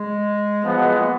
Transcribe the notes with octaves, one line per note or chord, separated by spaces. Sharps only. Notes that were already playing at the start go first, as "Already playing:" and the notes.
Already playing: G#3
F3 B3 F4 G#4 D#5 F#5
F#3
G#3
A#3